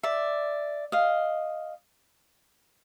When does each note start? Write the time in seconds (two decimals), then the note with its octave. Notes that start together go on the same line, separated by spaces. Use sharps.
0.03 D5 E5
0.92 D#5 F5